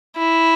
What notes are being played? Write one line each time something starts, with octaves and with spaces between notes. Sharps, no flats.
E4